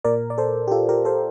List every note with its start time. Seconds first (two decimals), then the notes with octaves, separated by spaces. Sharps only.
0.04 A#2 A#4 D5
0.30 D5
0.38 A4 C5
0.68 G4
0.71 F4 A4
0.89 G4 A#4
1.05 A4 C5